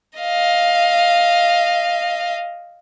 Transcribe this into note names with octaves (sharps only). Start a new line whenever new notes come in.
D#5 F5